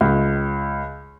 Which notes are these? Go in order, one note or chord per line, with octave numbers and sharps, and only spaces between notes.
C#2